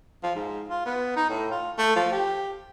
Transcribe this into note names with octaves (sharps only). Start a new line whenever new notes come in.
F3
G#2
F4
B3
D#4
A2
F4
A3
F3
G4